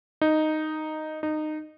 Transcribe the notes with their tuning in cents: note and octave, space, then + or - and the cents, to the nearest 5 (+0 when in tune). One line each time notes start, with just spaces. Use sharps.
D#4 -5
D#4 -20